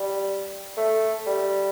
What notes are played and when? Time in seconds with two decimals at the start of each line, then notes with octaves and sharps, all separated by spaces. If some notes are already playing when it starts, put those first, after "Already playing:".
Already playing: G3
0.77 A3
1.26 G3